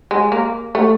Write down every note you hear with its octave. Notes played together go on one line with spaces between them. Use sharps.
G#3
A#3
A3